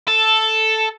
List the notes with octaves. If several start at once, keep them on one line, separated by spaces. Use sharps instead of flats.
A4